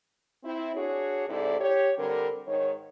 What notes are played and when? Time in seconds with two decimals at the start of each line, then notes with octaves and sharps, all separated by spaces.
0.44 C4 E4
0.75 D4 F#4 G#4 C#5
1.29 G#2 C3 E4 A4 D5
1.59 G4 C#5
1.97 D3 G3 C4 A#4
2.47 G#2 D#3 C#5